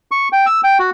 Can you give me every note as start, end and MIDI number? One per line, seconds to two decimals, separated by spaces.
0.11 0.28 85
0.33 0.46 79
0.46 0.61 88
0.64 0.78 79
0.79 0.90 66